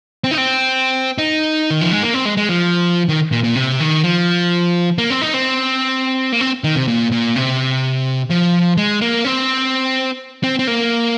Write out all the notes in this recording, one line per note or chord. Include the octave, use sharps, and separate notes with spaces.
C4
D#4
C4
D#4
D#3
F3
G#3
A#3
C4
G#3
G#3
F3
D#3
A#2
A#2
C3
D#3
F3
A#3
C4
D#4
C4
A#3
C4
D#3
C3
A#2
A#2
C3
F3
G#3
A#3
C4
C4
C4
A#3